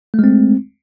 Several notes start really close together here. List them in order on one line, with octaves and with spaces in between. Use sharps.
A3 G#3 C4